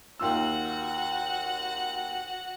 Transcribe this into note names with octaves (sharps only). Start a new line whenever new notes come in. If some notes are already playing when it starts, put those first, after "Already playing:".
D#2 F4 F#4 F#5 E6